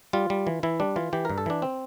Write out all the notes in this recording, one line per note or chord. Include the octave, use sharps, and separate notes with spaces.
G3 F4
G3
E3
E3 E4
G3 D4
E3 F4
E3 G4
G2 A#4
A4
E3 D4
C4